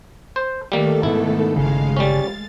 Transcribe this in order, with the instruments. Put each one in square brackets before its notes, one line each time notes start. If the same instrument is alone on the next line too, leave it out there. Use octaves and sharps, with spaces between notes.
[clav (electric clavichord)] C5
[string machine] D#3 A3 A4 [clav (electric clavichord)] G3 A#3
[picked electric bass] G#2 B2 [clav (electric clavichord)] E4
[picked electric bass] G1 C#3 [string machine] G#3 F5
[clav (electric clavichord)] G3 C#4 [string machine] A6